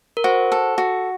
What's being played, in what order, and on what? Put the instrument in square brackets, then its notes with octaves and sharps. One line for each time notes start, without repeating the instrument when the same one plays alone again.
[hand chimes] A#4
[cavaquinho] F#4 [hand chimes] C5
[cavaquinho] A4
F#4